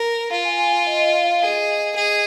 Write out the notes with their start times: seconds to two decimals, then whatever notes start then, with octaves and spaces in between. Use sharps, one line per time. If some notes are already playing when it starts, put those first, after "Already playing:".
Already playing: A#4
0.31 F4 F5
0.45 G#5
0.59 G#5
0.73 F5
0.87 D#5
0.99 D#5
1.13 F5
1.27 F5
1.41 G#4 D#5
1.96 G#4